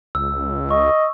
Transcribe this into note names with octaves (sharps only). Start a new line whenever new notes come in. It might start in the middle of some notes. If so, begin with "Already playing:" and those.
C#2 E6
D#5 C#6